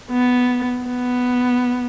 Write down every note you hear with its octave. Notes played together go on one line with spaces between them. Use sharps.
B3
B3